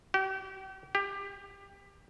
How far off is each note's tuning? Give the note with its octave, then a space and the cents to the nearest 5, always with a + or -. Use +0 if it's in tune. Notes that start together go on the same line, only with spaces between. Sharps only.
G4 -40
G4 +20